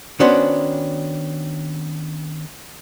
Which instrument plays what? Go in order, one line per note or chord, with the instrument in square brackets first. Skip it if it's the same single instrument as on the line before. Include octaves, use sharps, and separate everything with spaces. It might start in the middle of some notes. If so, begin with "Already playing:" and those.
[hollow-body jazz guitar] D#3 B3 C#4 D4 F#4 C5